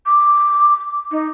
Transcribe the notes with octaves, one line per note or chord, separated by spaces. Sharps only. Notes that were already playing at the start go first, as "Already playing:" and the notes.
D6
D#4